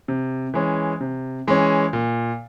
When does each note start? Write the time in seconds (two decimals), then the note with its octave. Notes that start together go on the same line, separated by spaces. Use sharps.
0.08 C3
0.54 E3 G#3 C#4
1.01 C3
1.47 E3 G#3 C#4
1.93 A#2